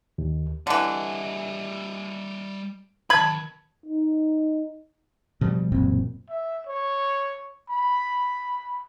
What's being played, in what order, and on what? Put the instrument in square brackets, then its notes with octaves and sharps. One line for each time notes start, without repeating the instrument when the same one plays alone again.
[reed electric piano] D#2
[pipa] D3 E3 [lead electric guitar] G3 D#5
[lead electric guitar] D#3 B4 [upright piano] A5 G#6 [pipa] B5
[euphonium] D#4
[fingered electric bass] B2 F3 G3
E1 F#2 A#2 C4
[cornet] E5
C#5
B5